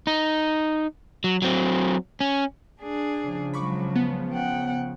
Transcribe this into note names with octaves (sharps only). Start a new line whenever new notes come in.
D#4
F#3
F#3 C4
C#4
D4 G#4
C#3 F3
F#3 G#3 B5 C#6 D6
B3
F#5 G5